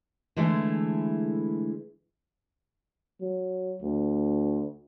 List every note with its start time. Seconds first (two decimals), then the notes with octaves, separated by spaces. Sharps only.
0.36 D3 E3 G#3 A3 E4
3.21 F#3
3.81 D2